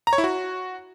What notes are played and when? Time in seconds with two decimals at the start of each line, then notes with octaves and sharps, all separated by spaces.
0.07 A#5
0.13 C#5
0.18 E4
0.24 F#4